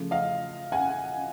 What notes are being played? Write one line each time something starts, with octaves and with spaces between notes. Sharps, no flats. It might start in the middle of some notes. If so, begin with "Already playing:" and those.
Already playing: C#3 F3 A3
D#5 F5
F#5 G#5